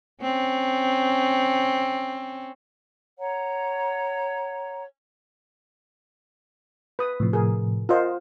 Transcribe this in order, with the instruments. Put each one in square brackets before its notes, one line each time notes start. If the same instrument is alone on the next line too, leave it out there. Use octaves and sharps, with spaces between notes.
[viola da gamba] C4 C#4
[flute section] C#5 F#5 A#5
[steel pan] B4 D#6
[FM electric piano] A2 C3 F3
[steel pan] G#4 A#4
[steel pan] F4 C5 F#5 [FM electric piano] A#4 D#5